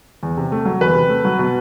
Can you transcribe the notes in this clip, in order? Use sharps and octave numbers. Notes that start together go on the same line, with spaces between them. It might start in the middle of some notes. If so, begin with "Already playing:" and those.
E2
C3
A3
F#3
E2 B4
C3
A3
F#3
B2